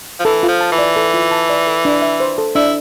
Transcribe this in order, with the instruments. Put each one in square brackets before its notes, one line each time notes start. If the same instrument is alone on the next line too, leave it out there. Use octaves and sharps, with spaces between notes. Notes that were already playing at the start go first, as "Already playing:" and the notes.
[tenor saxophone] F3
[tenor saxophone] E3 [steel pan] A4
[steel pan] F4
[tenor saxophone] F3
[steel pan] A5
[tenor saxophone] E3
[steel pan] D5
A4
F4
A5
D5
A4
D4
E5
C5
A4
[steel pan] D4 [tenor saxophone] E4